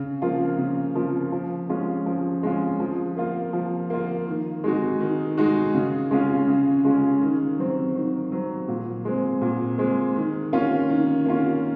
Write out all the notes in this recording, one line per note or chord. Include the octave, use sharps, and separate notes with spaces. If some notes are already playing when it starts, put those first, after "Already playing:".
Already playing: C#3
F3 A#3 F4
C#3
F3 A#3 F4
F3
G#3 C#4 F4
F3
G#3 C#4 F4
F3
A#3 F4
F3
A#3 F4
D#3
G#3 D#4 F#4
D#3
G#3 D#4 F#4
C#3
G#3 C#4 F4
C#3
G#3 C#4 F4
D#3
F#3 C4
D#3
F#3 C4
A#2
G#3 C4
A#2
G#3 C4
D#3
A#3 C#4 F4
D#3
A#3 C#4 F4